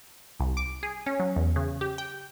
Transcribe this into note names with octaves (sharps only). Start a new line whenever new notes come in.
C2
D6
G#4
C#4
F#3
E2
C#3
G4
G5